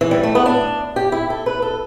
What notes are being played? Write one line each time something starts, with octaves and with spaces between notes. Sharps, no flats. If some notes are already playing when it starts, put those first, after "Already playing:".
E3
G3
A3
B3
D4
G4
E4
A4
B4
A4